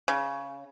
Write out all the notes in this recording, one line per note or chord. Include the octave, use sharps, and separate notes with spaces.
C#3